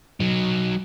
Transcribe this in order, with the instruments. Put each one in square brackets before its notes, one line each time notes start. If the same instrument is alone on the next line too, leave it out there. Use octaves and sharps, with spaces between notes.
[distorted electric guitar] F#3 D#4